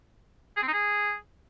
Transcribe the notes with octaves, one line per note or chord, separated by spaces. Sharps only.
G#4
C4
D#4
G#4